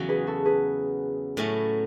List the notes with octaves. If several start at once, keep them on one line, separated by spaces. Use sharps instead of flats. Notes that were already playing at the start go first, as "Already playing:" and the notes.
Already playing: E2 C#3 F#3 F#4
G#4 B4
F#4 A4
G#4 B4
A2 F#3 A3 C#4 E4